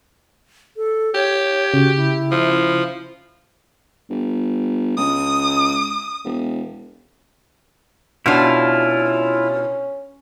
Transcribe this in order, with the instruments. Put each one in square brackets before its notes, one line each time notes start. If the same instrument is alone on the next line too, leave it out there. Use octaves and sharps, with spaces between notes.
[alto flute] A4
[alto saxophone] G4 [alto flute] C#5
[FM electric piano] C#3 [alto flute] F#4
[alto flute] E4
[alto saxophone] F3
[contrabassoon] G1
[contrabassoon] C#2 [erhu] D#6
[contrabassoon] E1
[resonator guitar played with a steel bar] B2 D4 [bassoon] C#4 [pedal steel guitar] E4 F4